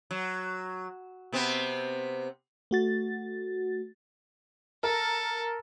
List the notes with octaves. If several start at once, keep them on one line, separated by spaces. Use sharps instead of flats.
F#3
C3 B3 C4
A3 F#4 A6
A4 A#4 A#5